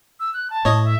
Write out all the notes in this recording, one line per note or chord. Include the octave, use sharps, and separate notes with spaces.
E6
F#6
A5
A2 C#5 D#5
E5